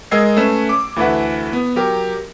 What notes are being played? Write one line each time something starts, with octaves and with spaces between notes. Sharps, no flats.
G#3 A#4 D#5 E6 G#6 C7
A3 C#4 B4 E7
D6
D2 E3 A3 E4 B4 F#5
B3
F#3 G4 A#4